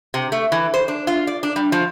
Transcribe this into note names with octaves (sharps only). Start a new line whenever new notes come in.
C3
A3
E3
C5
D4
F4
D5
D4
G3
F3